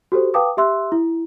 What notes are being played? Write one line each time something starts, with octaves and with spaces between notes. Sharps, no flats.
F#4 G4 A4 C5
B4 F5 G5 A5 D6 D#6
G4 E5 C6 E6 F#6
E4